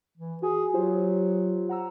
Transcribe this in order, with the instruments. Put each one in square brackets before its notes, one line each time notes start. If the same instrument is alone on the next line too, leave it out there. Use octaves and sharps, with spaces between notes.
[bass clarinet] E3
[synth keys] F#4 G#5 [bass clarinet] G#4
[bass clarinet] F#3 [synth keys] F4 G4 C5
[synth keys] F#5 A#5 E6